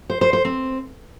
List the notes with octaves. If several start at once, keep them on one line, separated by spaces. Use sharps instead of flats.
C5
C5
C5
C4